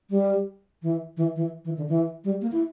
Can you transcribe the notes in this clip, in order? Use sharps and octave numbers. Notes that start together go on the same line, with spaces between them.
G3
E3
E3
E3
E3
D3
E3
G3
A#3
E4